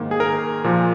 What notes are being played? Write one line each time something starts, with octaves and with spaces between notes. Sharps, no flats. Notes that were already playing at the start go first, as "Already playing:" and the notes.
Already playing: G#2 D#3 A#3
G#4
A#4
A#2 F3 A#3